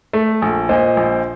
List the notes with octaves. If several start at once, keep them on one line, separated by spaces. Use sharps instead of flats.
A3
A#1
A#2 C5 D#5
A#1